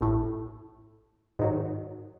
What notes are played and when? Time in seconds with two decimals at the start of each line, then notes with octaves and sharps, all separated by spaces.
0.01 A1 A2
1.39 G#2 D#3 F#3